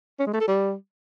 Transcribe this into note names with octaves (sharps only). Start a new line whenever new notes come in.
C#4
G#3
A3
A4
G3